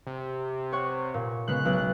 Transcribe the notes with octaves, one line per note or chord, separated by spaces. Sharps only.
C3
C#5 F#5 C#6
A#2
C#3 G#3 B3 F#6
B1